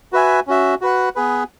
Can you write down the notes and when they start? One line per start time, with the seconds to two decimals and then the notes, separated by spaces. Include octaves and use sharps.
0.12 F#4 B4 E5 G#5
0.47 C#4 F#4 E5
0.81 F#4 B4 F#5
1.16 B3 G#4 B4